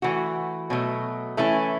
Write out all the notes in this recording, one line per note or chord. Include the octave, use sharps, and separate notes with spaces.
E3 A3 F#4
B2 F#3 A3
E3 A3 C#4 E4